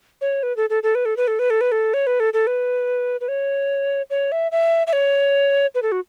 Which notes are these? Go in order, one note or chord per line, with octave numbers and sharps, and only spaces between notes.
C#5
B4
A4
A4
A4
B4
A4
B4
A4
B4
A4
B4
A4
C#5
B4
A4
A4
B4
B4
C#5
C#5
E5
E5
E5
C#5
B4
A4
F#4